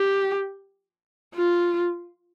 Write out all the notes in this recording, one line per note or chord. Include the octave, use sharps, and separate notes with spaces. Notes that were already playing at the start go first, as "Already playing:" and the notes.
Already playing: G4
F4